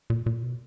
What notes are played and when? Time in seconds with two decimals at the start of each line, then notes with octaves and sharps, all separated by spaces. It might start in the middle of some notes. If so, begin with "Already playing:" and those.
0.10 A#2
0.26 A#2
0.43 B2